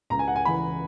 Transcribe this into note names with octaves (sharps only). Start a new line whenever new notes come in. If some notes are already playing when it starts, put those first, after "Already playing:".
C#2 A#5
G#5
F#5
G#5
C#3 E3 B5